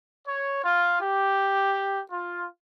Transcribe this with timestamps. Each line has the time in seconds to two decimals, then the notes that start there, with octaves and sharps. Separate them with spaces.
0.28 C#5
0.64 F4
1.02 G4
2.12 F4